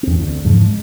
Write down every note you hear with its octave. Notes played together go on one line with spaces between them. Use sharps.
E2 C4
D2
E2 G#2 C#3 F3
G#3